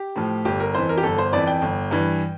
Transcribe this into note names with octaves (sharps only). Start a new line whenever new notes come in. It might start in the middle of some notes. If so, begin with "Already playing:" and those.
Already playing: G4
A2 F3
G1 G4
A#4
F2 E3 C5
A#4
G4
G1 A4
C5
F2 E3 D5
G5
G1
G2 E3